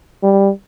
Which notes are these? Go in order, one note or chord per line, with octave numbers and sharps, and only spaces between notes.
G3